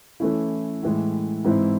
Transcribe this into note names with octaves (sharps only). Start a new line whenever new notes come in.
E3 A3 C#4 E4
A2 E3 G#3
G#2 E3 C4 E4